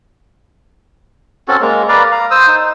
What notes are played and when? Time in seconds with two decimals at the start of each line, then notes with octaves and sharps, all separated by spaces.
1.48 C4 C#4 F#4 A4
1.61 G#3 A#3
1.89 B4 D5 F5 A#5
2.12 F5 A#5
2.31 C5 D#6 E6
2.47 D#4